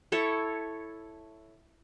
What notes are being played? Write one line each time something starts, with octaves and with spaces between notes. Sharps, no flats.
E4 A4 C#5